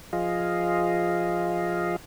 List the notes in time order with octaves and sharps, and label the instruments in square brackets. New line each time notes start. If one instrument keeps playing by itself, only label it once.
[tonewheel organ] F3 F4 G#4 D#5 F5